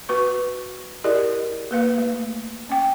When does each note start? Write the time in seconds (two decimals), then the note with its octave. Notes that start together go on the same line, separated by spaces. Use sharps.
0.09 F#4 B4 C#6
1.04 E4 G4 G#4 A#4 D5 D#5
1.71 A#3 B4 F5
1.98 A3
2.69 C#4 G5